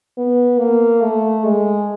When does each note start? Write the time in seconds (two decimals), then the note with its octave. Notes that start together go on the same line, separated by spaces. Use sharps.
0.18 B3
0.59 A#3
1.01 A3
1.44 G#3